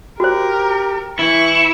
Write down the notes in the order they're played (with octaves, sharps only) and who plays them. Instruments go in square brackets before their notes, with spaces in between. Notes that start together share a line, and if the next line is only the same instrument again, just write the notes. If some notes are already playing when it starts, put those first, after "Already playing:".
[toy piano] F#4 C5 [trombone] G4 [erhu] A#4
[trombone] E3 [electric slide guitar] E4 [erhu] C#6